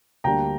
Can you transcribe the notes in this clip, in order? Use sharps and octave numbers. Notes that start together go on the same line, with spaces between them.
D2 D3 G3 A#3 D4 G5 A#5